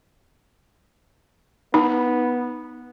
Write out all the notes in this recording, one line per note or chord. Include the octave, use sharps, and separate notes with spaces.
B3 D#4